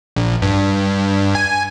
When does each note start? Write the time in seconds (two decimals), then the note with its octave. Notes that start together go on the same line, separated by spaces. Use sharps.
0.16 A#1
0.42 G2
1.35 G#5